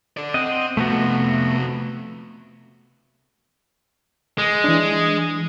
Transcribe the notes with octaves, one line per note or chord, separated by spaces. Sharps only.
A4 D5
C4 D#5 F#5
C3 F3 A3 B3 F#4
G#3
E3 D4